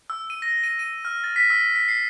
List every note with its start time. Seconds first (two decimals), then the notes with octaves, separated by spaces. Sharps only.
0.10 E6
0.30 D#7
0.42 A#6
0.64 D#7
0.79 D#7
1.05 F6
1.24 A6
1.36 B6
1.50 E6
1.76 B6
1.88 C7